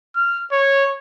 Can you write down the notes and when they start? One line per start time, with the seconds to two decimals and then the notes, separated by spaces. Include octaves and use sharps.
0.16 F6
0.52 C#5